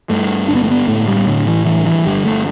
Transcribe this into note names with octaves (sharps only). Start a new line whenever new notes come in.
G2 A3
G1 D4
B3
A3
B3
A2 A3
G3
A2 D3
E3
G2 E3
E3
G1 G3
A3